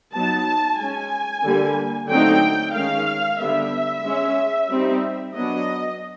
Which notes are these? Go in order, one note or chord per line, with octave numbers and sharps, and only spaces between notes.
F#3 B3 D#4 A5
G#3 C#4 G#5
D3 G3 A#3
D3 F#3 A3 C4 D#4 G5
D#3 G#3 C#4 F5
D3 G3 B3 E5
G#3 C#4
G3 C4 D#4
F#3 B3 D4 D#5